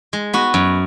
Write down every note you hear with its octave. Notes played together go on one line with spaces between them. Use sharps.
G#3
B3 F#4
F#2